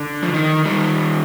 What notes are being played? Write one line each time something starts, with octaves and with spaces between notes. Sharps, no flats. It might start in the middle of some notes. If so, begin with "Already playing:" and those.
Already playing: D3
F3
D#3
D#3 G3